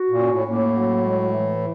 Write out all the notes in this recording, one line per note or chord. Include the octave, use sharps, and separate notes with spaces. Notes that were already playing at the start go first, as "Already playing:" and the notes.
Already playing: F#4
A#2
C#4
A2
A2 A#3
F#3
G#3
E3